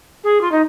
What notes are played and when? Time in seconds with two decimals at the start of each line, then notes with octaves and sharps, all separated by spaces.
0.24 G#4
0.41 F4
0.51 D#4